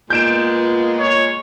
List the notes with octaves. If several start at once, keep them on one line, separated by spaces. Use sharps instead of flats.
A#2 G#3 B3 F4 G6 D7 E7
C#5